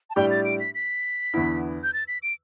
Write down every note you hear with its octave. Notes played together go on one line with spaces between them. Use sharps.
A5
A2 G3 D4 G4 G5
A6
D7
B6
B6
E2 D3 B3 E4
G6
A6
B6
D7